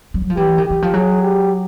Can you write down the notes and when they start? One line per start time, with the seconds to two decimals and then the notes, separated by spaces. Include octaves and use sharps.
0.14 G3
0.22 F#3
0.30 F3
0.37 E3 G4
0.58 D#3
0.66 E3 G4
0.82 F3
0.94 F#3 G#4
1.22 G4